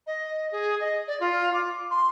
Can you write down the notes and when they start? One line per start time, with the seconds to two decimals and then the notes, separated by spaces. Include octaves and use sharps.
0.07 D#5
0.52 G#4
0.81 D#5
1.08 D5
1.20 F4
1.54 D6
1.91 C6